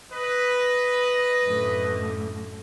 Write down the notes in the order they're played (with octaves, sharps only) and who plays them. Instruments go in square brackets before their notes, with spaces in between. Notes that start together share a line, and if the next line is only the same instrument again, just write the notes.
[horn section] B4 [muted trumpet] D#5
[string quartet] F#2 A2 D3